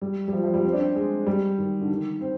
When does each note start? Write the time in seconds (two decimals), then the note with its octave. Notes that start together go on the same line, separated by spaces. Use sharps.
0.02 G3
0.28 G3
0.33 F3
0.43 F3
0.54 G3
0.64 C4
0.73 D4
0.80 C4
0.96 G#3
1.26 G3
1.58 D#3
1.81 D3
1.89 D#3
2.21 C4